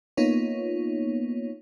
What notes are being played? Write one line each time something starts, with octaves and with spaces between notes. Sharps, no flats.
A#3 B3 D#4 F4 C#5